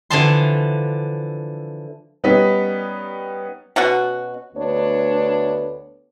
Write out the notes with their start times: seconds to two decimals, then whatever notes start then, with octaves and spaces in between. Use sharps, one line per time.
0.10 D3 E3 F3 A5 C6
2.24 G3 B3 C#4 D#4 B6
3.76 B2 C#4 F#4
4.56 D2 A3 B3 D4 C#5